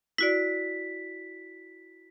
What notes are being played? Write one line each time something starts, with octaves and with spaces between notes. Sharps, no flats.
E4 F#4 D5 B6